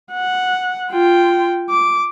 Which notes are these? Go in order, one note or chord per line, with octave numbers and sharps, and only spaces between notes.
F#5
F4 G5
D6